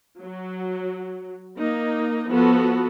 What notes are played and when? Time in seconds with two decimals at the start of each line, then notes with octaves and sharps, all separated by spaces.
0.22 F#3
1.59 A#3 D#4
2.31 F3 B3 F#4 A4 B4